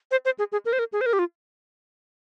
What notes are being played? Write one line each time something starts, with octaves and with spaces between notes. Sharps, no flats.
C5
C5
G#4
G#4
A#4
C5
A#4
G#4
C5
A#4
G4
F4